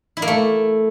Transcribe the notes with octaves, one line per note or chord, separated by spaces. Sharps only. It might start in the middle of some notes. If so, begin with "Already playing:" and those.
E4
A#3
A3